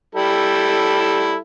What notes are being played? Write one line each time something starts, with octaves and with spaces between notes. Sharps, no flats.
G3 E4 A4